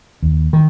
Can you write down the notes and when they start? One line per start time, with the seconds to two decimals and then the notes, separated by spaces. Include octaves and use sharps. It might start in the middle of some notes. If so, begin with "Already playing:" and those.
0.23 D#2
0.53 D#3